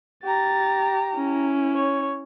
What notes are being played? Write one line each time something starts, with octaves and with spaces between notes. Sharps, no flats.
G4 A#5 A6
C#4 E4
C#5